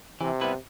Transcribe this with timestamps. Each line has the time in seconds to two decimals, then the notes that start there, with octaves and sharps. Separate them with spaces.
0.21 C3 E3
0.41 G3 B3 E4 B4